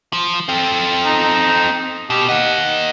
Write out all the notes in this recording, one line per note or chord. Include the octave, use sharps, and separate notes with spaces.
F3
C4 A4
D#4
B2 G4
A#3 D#5 F#5